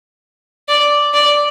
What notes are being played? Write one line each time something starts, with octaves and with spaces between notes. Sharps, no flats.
D5
D5